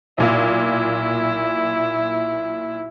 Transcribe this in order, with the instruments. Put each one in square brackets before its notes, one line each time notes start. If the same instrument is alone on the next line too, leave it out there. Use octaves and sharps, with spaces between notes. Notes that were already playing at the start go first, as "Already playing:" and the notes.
[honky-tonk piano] B1 A#2 F5 [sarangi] E4